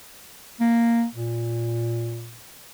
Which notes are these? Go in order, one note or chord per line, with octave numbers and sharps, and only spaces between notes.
A#3
A#2